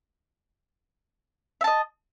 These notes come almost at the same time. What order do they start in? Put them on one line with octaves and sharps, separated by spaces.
E5 A5 D#5